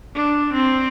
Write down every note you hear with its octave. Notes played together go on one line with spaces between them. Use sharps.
D4
C4